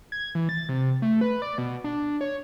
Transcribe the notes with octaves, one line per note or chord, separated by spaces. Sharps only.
G#6
E3
A6
C3
A3
B4
D5
B2
D4
C#5